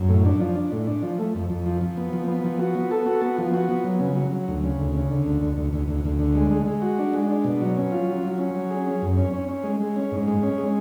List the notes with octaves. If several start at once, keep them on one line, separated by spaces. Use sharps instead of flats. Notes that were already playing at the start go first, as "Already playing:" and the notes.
Already playing: F#2
A2
D4
F3
D4
A2
D4
F3
A3
F2
F2
F3
F3
B3
F3
B3
F3
F#4
B3
A4
F#4
B3
F3
F#4
B3
F#3
C#3
F#3
F#3
D2
C#3
D2
C#3
D3
D2
D2
D2
D2
D2
D2
D3
G#3
G#3
G#3
F#4
D4
G#3
D4
B2
F#3
C#4
F4
F#3
F#3
C#4
F#3
G#4
C#4
F#2
C#4
C#4
C#4
G#3
G#3
C#4
G#2
G#3
C#4
G#3